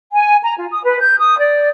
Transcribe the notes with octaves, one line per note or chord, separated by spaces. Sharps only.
G#5
A#5
F4
D#6
B4
G6
D#6
D5